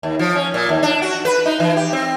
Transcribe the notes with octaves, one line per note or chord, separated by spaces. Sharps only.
D#2
F3
C#4
A#2
D#2
D4
F#4
B4
D#4
E3
G4
C4